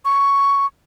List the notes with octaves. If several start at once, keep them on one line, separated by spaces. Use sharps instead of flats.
C#6